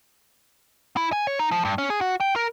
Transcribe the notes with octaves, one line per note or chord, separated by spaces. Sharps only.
E4
G#5
C#5
D#4
F3
G2
C#4
G#4
F#4
G5
A#4